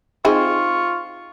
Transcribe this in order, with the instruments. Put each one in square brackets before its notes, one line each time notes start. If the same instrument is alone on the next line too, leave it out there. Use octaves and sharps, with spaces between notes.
[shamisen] C4 D#4 G#4 [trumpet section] F4 C#6